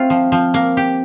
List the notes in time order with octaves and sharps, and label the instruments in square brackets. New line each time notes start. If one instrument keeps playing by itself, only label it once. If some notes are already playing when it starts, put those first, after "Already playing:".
Already playing: [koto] A3 F4 [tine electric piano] C4
[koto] F3
F3
A#3
G4